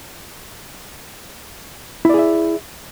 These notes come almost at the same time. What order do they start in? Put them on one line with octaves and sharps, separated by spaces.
E4 D5 G#4 E5